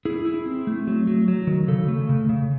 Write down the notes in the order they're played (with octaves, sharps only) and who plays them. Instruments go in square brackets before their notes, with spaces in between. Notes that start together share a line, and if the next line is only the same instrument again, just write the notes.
[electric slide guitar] E4 G#4
E4
C4
A3
F#3
F#3
F#3
D#3
C#3 A4
A3
C#3
C#3